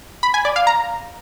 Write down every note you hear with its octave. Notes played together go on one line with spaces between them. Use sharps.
B5
G#5
D5
F5
A#5